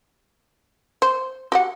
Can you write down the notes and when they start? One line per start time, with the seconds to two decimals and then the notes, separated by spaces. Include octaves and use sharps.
1.02 C5
1.52 F#4 G4 F#5